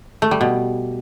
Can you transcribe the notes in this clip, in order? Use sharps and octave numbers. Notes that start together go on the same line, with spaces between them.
A3
G3
B2